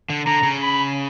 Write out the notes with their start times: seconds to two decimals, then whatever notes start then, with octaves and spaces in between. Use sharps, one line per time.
0.10 D3
0.26 D3 A#5
0.43 C#3
0.61 B5